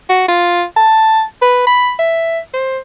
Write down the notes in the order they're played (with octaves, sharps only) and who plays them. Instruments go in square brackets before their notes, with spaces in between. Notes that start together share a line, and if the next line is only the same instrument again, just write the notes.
[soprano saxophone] F#4
F4
A5
B4
B5
E5
C5